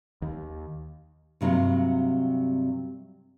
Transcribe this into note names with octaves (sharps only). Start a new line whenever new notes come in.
D#2
G2 C3 F#3 A#3 F4